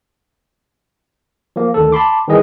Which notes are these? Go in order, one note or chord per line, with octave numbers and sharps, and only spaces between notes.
F3 A#3
D2 D#3 A4
A5 B5 C6 D6
D#3 E3 G3 G#4 D#5